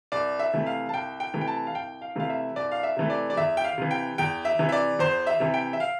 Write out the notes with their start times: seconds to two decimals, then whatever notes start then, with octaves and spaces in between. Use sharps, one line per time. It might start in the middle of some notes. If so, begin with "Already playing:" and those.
0.12 C2 D5
0.39 E5
0.53 C3 E3 A3
0.66 F5
0.89 A5
0.93 C2 G5
1.20 G5
1.34 C3 E3 A3
1.41 G5
1.47 A5
1.67 F5
1.75 C2 G5
2.02 F5
2.16 C3 E3 A3 F5
2.30 E5
2.56 C2 D5
2.71 F5
2.83 E5
2.97 C3 E3 A3
3.10 D5
3.30 D5
3.37 E2 E5
3.57 G5
3.64 F5
3.78 C3 E3
3.91 G5
4.18 E2 G5
4.45 E5
4.59 C3 E3
4.69 E5
4.72 D5
4.99 E2 C5
5.27 E5
5.40 C3 E3
5.54 G5
5.73 E5
5.80 F5